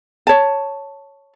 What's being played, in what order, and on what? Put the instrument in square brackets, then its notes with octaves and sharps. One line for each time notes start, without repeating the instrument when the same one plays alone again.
[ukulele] C#5 A5